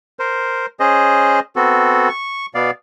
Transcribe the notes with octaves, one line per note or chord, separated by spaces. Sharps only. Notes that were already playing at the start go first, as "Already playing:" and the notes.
A#4 C5
C#4 G#4 C5 D#5
B3 C4 F#4 A4
C#6
B2 B3 D5 F5